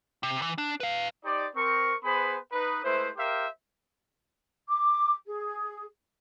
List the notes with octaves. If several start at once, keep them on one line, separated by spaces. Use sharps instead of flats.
C3
E3
D4
B4 F5
D#4 G4 C5 D5
C4 A#4 C#6
B3 G#4 B4 C5 B5
D#4 B4 D#6
G#3 A3 E4 B4 C5
G4 A#4 C5 E5 F5 G5
D6
G#4